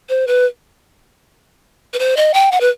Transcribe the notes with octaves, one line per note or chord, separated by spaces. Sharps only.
C5
B4
B4
C5
D#5
G5
F#5
B4